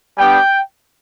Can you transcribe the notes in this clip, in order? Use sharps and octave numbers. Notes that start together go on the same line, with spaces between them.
G3 B3 D4 G4 G5